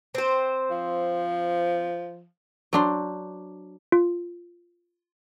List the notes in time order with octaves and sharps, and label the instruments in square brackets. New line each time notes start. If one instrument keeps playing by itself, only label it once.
[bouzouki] C4 C5
[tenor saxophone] F3
[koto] F#3 D4 C5
[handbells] F4